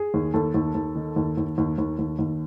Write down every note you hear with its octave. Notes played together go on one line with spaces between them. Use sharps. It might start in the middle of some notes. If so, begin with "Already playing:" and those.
Already playing: G#4
D#2
D#2 A4
D#2
D#2
D#3
D#2
D#2
D#2
D#2
D#2
D#2